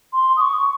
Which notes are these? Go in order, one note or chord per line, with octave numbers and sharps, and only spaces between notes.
C6
D#6
C#6